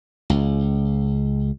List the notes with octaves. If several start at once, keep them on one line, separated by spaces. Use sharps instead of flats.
C#2